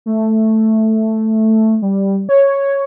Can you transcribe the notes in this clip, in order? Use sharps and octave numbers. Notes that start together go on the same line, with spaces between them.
A3
G3
C#5